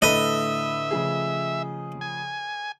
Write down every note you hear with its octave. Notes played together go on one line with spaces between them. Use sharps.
A2 D3 A3 A4 B4 D#5 E5
C#3 F3 G#4
G#5